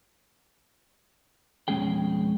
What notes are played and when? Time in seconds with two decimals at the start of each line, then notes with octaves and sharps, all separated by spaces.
1.68 F2 B2 G#3 C#4 G#4 G5